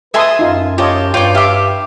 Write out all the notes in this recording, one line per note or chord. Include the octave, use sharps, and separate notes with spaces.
A4 B4 E5 G#5 A5 C6 D#6
F#2 D#4 F4
F4 G4 C#5 D#5 A5
G2 F4 C#5 D5 G5
G4 E5 F5 D6